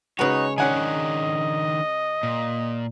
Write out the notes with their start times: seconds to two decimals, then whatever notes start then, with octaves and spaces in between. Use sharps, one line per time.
0.19 C#3 G#3 D#4 F#4 B4 C#5
0.58 D#3 C#4 D4 D#5 F#5 G#5
2.23 A#2